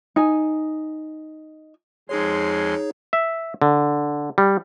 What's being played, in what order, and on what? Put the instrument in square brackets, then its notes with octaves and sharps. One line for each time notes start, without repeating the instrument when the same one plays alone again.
[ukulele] D#4 G#5
[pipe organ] F2 G#3 C6 [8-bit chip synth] D#4 G#4 C#5
[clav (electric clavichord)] E5
D3
G3